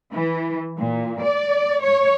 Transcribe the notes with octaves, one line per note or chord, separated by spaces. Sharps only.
E3
A#2
D5
C#5